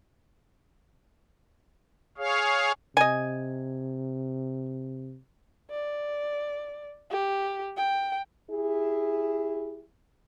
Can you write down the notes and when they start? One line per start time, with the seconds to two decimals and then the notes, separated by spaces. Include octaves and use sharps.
2.18 G#4 C#5 F5
2.97 C3 D#5 G#5
5.70 D5
7.11 G4
7.77 G5
8.50 E4 G4 G#4